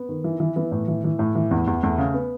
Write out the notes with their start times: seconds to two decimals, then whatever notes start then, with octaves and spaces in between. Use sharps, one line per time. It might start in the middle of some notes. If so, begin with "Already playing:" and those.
Already playing: B3
0.09 D#3
0.24 E3
0.40 E3
0.56 E3 B3
0.71 A2
0.88 E3
1.04 E3
1.19 A2
1.35 E3
1.51 E2
1.67 E2
1.83 E2 A3
1.98 C#3
2.14 B3